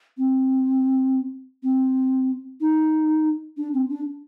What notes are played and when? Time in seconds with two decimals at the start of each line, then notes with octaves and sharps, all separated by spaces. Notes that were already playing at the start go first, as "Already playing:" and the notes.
0.18 C4
1.63 C4
2.61 D#4
3.57 D4
3.73 C4
3.89 D4